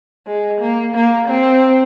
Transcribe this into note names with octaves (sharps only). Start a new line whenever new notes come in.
G#3
A#3
A#3
C4